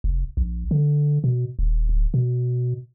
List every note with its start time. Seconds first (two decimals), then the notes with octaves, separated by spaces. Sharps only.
0.04 F1
0.37 A#1
0.71 D3
1.24 B2
1.59 D#1
1.89 D1
2.14 B2